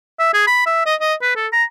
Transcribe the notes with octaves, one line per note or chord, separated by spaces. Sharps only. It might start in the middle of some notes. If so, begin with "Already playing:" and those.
E5
G#4
B5
E5
D#5
D#5
B4
A4
A#5